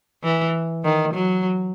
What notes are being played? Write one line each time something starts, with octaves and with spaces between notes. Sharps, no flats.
E3
D#3
F#3